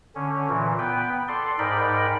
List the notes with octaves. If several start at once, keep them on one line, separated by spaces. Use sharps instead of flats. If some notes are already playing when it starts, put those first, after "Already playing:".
D3 C#4
A#2 E3
B3 B4 G5
A4 D5 C6
G#2 D#4 A#4 D5 G5 B5